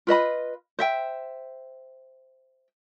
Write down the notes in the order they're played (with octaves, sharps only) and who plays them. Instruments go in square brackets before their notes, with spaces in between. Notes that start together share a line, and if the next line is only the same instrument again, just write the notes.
[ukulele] F4 B4 D#5 B5
C5 E5 G5